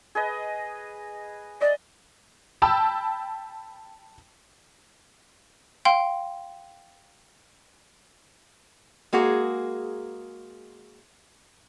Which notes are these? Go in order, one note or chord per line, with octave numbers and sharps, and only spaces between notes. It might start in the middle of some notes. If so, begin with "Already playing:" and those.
G#4 B4 D#5
D5 D#5
G5 A5 B5 E6
F5 G5 C6
G#3 A#3 F#4 G#4